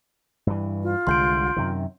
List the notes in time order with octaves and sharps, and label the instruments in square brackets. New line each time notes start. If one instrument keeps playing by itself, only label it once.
[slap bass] G2 E3
[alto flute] F4
[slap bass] C2 D3 G#3 [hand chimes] C6 G6 D7
[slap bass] F#2 C3 D#3